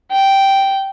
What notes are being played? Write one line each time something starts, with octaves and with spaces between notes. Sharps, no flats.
G5